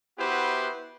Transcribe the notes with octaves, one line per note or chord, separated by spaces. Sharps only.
B3 E4 F#4 G4 B4 C5